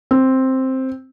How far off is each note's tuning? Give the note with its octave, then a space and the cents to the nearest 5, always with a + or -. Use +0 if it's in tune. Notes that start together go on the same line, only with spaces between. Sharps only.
C4 +5